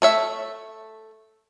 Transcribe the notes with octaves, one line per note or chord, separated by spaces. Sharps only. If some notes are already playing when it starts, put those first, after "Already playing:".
A3 C#5 E5